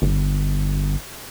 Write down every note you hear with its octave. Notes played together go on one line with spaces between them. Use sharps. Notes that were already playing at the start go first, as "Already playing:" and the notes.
G1